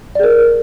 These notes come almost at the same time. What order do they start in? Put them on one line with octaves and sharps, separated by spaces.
D5 G#4 A#4